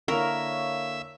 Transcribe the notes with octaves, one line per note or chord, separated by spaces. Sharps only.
D3 A#3 E4 A#4 C#5 E5 F5 C#6